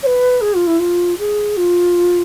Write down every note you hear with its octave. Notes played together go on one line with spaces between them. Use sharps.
C#5
B4
G#4
F4
E4
F4
G#4
F4